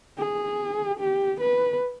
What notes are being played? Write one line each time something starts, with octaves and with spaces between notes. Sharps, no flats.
G#4
G4
B4